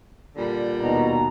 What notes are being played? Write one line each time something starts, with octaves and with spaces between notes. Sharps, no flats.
A#2 D3 G3
D#2 B2 A#5